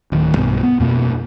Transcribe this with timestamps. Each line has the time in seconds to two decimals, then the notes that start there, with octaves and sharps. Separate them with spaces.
0.12 D1 D#3
0.37 B1 G2 B2
0.63 B3
0.80 F2 B2 A#3